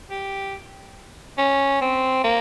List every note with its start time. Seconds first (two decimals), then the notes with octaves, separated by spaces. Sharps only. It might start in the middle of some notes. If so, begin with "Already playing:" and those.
0.10 G4
1.38 C#4
1.81 C4
2.24 A#3